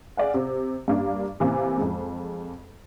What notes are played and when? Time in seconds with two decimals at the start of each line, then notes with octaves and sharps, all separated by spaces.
0.17 G#4 D5 F5 F#5
0.34 C3
0.88 G2 A#3 D4
1.40 C3 E3 A#3
1.78 F2 G#3